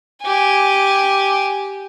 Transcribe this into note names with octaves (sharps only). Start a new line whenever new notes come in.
G4 G#5